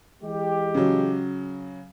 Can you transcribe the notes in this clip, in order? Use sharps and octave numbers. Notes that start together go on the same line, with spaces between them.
E3 G#3 G4
C#3 F#3